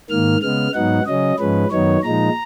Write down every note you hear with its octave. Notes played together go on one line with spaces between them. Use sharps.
G#2 D#3 A#3 F6
C#3 G#3 B3 F6
G#2 F#3 B3 D#4 F#5
C#3 F#3 C#4 D#5
G#2 F3 G#3 C#4 B4
F#2 D#3 F#3 B3 D#4 C#5
A#2 F3 G#3 D#4 A#5